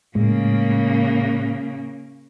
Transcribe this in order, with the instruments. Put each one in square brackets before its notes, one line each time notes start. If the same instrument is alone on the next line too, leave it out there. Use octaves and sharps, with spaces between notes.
[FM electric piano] A2 G#3 [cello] C#3 A#3